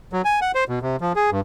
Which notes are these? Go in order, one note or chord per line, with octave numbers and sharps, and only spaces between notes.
F#3
G#5
F#5
C5
B2
C3
F3
G#4
G2